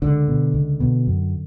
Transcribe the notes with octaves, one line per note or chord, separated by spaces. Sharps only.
C#2 D3
B2
C#2
B2
F#2